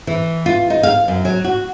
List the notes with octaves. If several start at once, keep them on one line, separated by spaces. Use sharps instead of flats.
E3
F4
D#4
F5
F#2
F#3
F#4